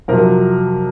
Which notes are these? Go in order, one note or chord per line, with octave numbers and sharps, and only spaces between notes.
F2 C3 F#3 A#4